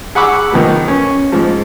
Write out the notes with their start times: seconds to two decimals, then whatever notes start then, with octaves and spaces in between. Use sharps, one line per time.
0.15 G#4 F#5 B5 C#6 D6 E6
0.51 D#3 F3 B3
0.88 C#4
1.32 G#2 F3